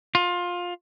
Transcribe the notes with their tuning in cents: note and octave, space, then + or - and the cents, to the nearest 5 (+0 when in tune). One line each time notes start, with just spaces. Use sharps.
F4 +20